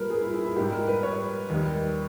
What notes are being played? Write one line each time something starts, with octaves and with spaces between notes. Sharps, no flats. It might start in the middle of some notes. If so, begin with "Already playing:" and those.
Already playing: A#2 G3 A#4 B4
G#4
E4
E4
E4
G#2 G3 G4
A#4
B4
C#5
D#2 D#3 G3